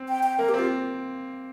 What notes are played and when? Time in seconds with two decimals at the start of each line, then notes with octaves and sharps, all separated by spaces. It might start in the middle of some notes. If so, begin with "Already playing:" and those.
Already playing: C4
0.08 G5
0.23 G5
0.38 A#3 A#4
0.49 G4
0.54 C4 F4